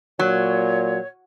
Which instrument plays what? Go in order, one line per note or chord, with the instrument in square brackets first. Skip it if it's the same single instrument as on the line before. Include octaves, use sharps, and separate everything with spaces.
[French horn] A#2 [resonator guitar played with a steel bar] F#3 [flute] C#5